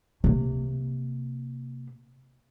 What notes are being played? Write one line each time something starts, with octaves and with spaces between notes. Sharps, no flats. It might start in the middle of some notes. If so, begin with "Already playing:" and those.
C3 A#3